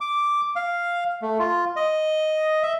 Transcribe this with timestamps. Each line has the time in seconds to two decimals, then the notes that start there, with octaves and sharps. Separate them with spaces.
0.01 D6
0.56 F5
1.22 A3
1.39 F4
1.76 D#5
2.63 E5